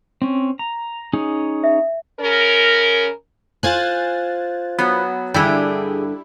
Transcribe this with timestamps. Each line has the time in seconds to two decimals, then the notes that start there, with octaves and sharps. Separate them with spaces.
0.22 C4 C#4
0.59 A#5
1.13 C#4 D#4 G#4
1.64 E5
2.20 C#3 C#4 A#4
3.63 F4 C5 G#5 F#6 G#6 A6
4.79 F#3 B3
5.34 G2 D3 G3 E4 G4 G#4